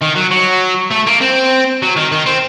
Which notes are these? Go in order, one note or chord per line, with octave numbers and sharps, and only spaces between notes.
D#3
F#3
F#3
A3
A#3
C4
F#3
D#3
D#3
C4